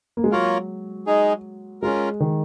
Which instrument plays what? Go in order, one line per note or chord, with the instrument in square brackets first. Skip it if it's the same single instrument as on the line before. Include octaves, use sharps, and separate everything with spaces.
[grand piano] A#3
G#3
[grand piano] F#3 [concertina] A#3 F4 A#4 C#5
[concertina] G#3 D#4 G#4
[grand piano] G#3 [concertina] C#4 F4 A#4
[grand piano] D#3